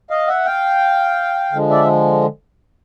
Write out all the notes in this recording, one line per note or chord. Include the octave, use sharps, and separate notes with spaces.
D#5 F5
E5 F#5
F5 G5
D3 F3 G#3
D5 E5